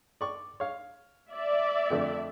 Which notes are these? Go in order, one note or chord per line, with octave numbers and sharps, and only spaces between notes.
D5 C#6
C#5 F5
D5 E5
F2 D3 A3